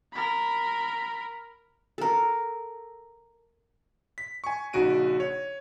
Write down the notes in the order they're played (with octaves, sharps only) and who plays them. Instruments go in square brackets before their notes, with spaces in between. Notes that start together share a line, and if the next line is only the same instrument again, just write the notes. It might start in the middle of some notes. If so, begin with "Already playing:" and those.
[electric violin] A#4 B5
[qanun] A4 A#4
[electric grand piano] B6
G#5 C#6
A#1 C#3 D#4 F#4 D7 D#7
C#5